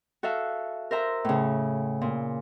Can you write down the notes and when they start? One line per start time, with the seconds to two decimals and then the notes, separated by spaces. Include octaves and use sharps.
0.23 F#4 A4 E5 F5
0.91 A#4 C5 E5 A#5
1.25 A2 C#3
2.02 A#2